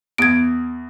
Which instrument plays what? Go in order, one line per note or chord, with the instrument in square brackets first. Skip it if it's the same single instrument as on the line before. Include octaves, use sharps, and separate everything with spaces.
[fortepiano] E2 [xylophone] G#6 D7